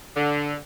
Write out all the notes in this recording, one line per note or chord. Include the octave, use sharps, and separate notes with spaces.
D3